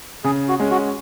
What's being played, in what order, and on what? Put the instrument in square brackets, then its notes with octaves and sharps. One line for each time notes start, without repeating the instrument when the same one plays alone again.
[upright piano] C#3 [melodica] G#4
[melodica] F#4
[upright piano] G#3 C#4
[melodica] F#4